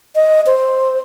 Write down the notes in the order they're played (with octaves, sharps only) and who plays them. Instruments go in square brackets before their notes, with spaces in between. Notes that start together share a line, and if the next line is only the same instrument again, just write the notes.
[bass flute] D#5
C5